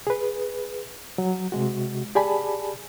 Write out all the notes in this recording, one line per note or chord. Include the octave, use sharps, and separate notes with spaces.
G#4 B4
F#3
C3 G#3 F#4
G4 G#4 D5 G#5 A5 B5